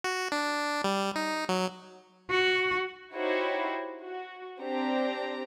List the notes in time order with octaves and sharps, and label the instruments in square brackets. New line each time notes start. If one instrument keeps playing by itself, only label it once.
[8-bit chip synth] F#4
D4
G3
D#4
F#3
[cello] F#4
[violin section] D#4 E4 F#4 G4 C5 C#5
F#4
C4 D4 G4 A#5